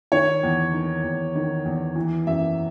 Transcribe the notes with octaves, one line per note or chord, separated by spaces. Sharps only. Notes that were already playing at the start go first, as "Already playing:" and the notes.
D#3 C#5
E2
D#3
E2
D#3
E2
E3
F#2 E5